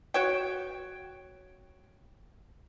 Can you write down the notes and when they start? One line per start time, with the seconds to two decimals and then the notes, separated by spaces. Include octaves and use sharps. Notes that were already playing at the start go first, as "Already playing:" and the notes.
0.14 F#4 C#5 G5